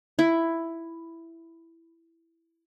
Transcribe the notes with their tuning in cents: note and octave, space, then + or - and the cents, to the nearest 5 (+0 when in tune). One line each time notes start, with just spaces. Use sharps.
E4 +5